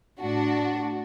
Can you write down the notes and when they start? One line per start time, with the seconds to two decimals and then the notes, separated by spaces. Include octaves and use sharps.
0.20 A2 D4 F#4